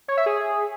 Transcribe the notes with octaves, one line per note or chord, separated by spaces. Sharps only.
C#5
E5
G#4